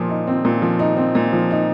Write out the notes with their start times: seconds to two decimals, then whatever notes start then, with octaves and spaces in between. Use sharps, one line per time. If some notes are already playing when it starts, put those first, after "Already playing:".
Already playing: A#2 F3
0.09 D#4
0.27 C4
0.45 A#2
0.62 F3
0.79 D#4
0.97 C4
1.15 A#2
1.33 F3
1.51 D#4